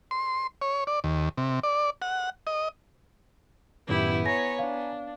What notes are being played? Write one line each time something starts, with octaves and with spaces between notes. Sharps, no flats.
C6
C#5
D5
D#2
C3
D5
F#5
D#5
F#2 A2 D#3 B3 E4 G4
C#5 G#5 A#5 A#6
D4 F5